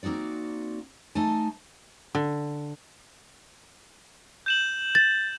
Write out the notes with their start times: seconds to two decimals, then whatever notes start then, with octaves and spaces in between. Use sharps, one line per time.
0.03 A#3 C4 D#4 F#4 D5
1.15 A3 D#4 D#5 G#5 A5
2.15 D3
4.46 G6 E7 F#7
4.95 A6